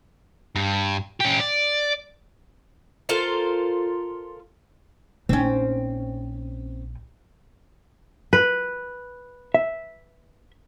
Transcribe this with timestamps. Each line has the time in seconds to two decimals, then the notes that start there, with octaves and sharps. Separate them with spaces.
0.56 G2
1.20 C#4 G4
1.40 D5
3.09 F4 A4 A#4 C5
5.29 A#1 C4 C#4 D#4
8.33 B4
9.54 E5